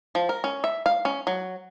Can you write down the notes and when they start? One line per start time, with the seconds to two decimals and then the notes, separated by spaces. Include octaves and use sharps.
0.15 F3
0.29 A#4
0.44 C#4
0.64 E5
0.86 F5
1.05 C#4
1.27 F#3